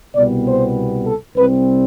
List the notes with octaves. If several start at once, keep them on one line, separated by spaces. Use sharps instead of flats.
C2 B2 G3 B3 D5
C5
A4
C2 C3 G3 C4 B4